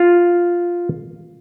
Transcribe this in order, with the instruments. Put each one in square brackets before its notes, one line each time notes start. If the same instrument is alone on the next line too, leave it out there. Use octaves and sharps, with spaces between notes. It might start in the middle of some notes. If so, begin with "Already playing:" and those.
Already playing: [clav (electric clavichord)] F4